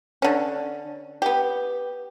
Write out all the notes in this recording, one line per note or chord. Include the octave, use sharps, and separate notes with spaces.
D3 C#4
B3 G4